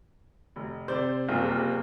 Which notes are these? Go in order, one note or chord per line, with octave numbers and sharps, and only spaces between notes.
F1
C3 C5 D5 G6
F#1 G3 A#3 F4